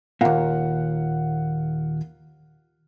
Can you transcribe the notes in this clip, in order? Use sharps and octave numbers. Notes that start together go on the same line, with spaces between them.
D#2 A#2 A#4 F5 F#5